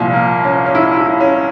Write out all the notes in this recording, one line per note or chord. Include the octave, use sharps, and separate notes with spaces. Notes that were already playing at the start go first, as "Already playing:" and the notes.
Already playing: C2 A#2 F3
A#3
C#4
C#4
E4
E4
C#4